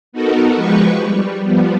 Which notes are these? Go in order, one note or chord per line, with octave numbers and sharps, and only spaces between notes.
B3 D#4 F#4 A4 A#4
F3 G#3 G4 B4 C#6
G3
F3 G3 B3